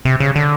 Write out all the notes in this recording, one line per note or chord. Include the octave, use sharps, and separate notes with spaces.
C3
C#3
D3